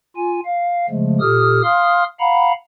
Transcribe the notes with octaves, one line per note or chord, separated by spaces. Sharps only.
F4 G#5
F5
C#3 F3 G#3 A3
A#2 G4 A4 D#6 F6
F5 C6 D#6 F6
F5 F#5 A#5 B5